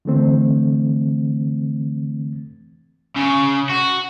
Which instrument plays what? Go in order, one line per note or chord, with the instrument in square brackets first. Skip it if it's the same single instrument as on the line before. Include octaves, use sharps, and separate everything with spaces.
[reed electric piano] D3 E3 A3 C4
[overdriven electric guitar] C#3
F#4